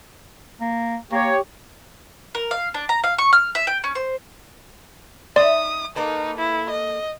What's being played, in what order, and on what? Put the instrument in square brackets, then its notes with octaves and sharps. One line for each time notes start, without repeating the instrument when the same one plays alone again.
[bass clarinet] A#3
[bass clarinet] A#3 [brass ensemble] G4 C#5
[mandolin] A#4
F5
D4
A#5
F5
C#6
F6
E5
G5
C#4
C5
[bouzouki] D#4 E5 [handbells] D5 C6 [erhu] D#6
[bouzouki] A#3 A4 B4 [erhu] D#4
[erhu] E4
D#5